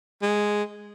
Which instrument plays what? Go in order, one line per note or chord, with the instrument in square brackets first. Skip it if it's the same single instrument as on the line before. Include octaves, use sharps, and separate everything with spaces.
[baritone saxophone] G#3